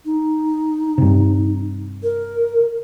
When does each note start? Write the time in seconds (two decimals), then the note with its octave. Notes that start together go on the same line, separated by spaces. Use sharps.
0.05 D#4
0.98 G2 C3
2.03 A#4